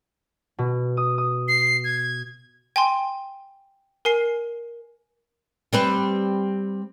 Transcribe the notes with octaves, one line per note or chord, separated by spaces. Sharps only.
B2
D#6
D#6
C7
G#6
G5 G#5 C6
A#4 G#5 C7
G3 C4 B4